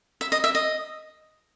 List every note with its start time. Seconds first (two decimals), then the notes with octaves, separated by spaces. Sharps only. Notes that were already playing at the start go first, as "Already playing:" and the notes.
0.21 E5
0.32 D#5
0.44 E5
0.55 D#5